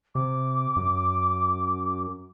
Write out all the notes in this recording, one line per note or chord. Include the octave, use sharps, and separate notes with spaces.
C3 D6
F#2